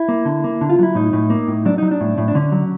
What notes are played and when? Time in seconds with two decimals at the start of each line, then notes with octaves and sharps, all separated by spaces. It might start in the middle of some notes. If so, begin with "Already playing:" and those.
Already playing: E4
0.09 A#3
0.25 D3
0.44 A#3
0.61 D3
0.69 F4
0.79 F#3 E4
0.95 A2 D#4
1.13 A2
1.30 A#3
1.48 A2
1.65 F#3 D4
1.78 F#3 D#4
1.91 D4
2.01 A2
2.18 A2
2.28 D4
2.35 D3 C#4
2.52 F#3